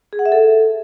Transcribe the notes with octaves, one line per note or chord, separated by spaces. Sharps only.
G#4
F#5
E5
A4